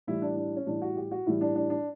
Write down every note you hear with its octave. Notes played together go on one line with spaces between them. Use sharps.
A2 E3 G3 E4
D4
D4
C#4
A2 E3 G3 D4
F#4
G4
F#4
A2 E3 G3 E4
D4
D4
D4